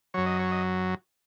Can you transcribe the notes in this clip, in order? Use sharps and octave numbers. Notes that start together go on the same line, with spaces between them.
F#2 F#3 C#5
D#5
C#5
D#5